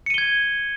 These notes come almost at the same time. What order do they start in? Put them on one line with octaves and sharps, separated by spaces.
C#7 D#7 G7 G#6